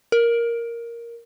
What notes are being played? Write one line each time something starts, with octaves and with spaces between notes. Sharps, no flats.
A#4